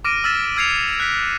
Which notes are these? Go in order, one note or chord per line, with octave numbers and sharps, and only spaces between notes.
D6 F6 A#6 D7 D#7
E6 F6 A6 B6 E7
E6 F6 G#6 C7 C#7 F7
F#6 B6